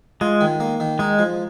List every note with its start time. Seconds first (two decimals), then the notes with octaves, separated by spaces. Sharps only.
0.21 G#3 F4
0.41 D#3
0.60 A#3
0.80 D#3
0.99 G#3 D#4
1.19 F3